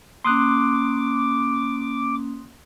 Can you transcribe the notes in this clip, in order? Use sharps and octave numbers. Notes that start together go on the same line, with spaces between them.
A#3 C#4 C6 D6 D#6 F#6